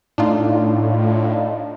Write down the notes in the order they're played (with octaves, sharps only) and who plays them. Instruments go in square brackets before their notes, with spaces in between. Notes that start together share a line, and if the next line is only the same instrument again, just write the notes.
[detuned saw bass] A2 [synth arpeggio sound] D4 D#4 F4